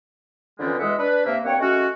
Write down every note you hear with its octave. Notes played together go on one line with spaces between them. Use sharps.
F2 D3 E3 G3 G#3 C#4
E2 B2 G#3 E5 F#5 D#6
D4 B4
C3 A#3 E5
G2 A#3 C4 C#5 F#5 G5
G#3 A3 C#4 F#4